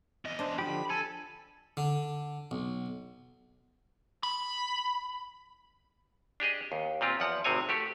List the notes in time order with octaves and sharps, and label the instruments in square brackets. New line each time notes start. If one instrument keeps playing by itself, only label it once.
[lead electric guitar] E2 D#5
[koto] D4 C5
[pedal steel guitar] D3 F3 G4 [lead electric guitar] B5
[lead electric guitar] A4 [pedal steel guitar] G#5
[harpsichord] D3
B1
[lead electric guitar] B5
[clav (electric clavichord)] D4 G4 G#4 D#5
D#2
A#2 C4 F4 G4
E2 F3 F#5
G#1 A2 C3 C4 C#5 G#5
A3 F#4 G4